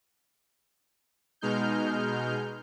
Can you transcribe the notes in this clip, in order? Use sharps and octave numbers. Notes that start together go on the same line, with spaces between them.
B2 G#3 D#4 F6 G6